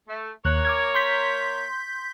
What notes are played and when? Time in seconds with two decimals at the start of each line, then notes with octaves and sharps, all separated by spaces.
0.08 A3
0.45 D#2 A#3 A#4 C#5 F#6
0.65 D6 F6 G#6
0.95 C6 G6 B6